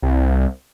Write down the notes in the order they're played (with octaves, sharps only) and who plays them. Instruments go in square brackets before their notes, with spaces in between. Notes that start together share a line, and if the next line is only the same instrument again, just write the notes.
[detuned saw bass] C2